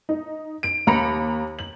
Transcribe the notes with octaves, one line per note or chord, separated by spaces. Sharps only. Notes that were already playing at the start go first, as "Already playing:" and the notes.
D#4
D7
D#2 A#5 B5 C#7
F#7